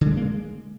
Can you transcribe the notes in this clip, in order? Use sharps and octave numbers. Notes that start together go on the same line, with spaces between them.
D3
G#3
D4
A#3
G#3